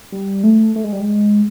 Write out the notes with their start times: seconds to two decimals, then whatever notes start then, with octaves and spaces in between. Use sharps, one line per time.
0.12 G3
0.44 A3
0.76 A3
0.84 G#3
0.93 G3
1.00 G#3